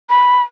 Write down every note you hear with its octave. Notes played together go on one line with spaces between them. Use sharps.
B5